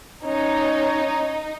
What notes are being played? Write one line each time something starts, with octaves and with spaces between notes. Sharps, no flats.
C#4 D#4 C#5